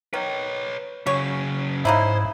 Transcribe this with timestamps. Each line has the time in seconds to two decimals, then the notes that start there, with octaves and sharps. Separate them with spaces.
0.14 D#3 B4 C#5
1.07 C#3 F#3 C#5
1.85 G#2 C#3 D#4 E4 C5